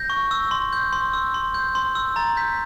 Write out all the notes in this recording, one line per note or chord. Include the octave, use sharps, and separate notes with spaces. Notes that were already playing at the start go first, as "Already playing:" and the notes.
Already playing: G6 A#6
C#6
E6
C6
G6
C6
E6
C6
G6
C6
E6
A#5 A6
G6 B6